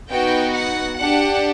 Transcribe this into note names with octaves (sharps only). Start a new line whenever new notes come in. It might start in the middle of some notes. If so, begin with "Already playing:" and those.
B3 D#4 F#4 G5
F#5
D4 G4 F#5